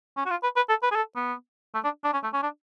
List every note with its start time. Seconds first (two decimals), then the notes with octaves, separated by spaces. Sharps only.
0.17 C#4
0.26 F#4
0.31 F4
0.43 B4
0.56 B4
0.69 A4
0.83 B4
0.91 G#4
0.96 A4
1.16 B3
1.75 A3
1.84 D4
2.04 D4
2.14 C#4
2.24 A3
2.33 C#4
2.43 D4